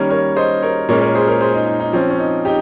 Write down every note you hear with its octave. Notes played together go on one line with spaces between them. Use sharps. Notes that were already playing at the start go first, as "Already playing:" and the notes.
Already playing: D#3 G3 A#3 C#4 A#4 C#5
A#4 C#5
C5 D#5
A#4 C#5
A#2 G#3 C#4 A#4 C#5
A#4 C#5
G#4 C5
A#4 C#5
G#4 C5
D#4
D#4
D#4
F3 C4 C#4
C#4
D#4
D#4 G4